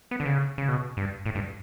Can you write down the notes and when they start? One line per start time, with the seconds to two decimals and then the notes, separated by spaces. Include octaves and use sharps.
0.11 B3
0.20 D3
0.26 C#3
0.58 C#3
0.69 B2
0.97 G2
1.26 A2
1.35 G2